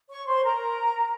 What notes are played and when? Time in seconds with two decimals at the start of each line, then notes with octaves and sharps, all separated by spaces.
0.10 C#5 C#6
0.27 C5 C6
0.44 A#4 A#5